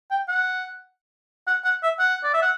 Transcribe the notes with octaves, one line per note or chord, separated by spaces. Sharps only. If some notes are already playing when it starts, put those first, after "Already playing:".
G5
F#5
F#5
F#5
E5
F#5
D5
E5
F#5